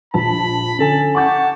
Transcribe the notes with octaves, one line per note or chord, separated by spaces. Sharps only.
A#1 A5 B5
D3 C#4 A4 G#5 A5
F#5 A5 C#6 D6 G6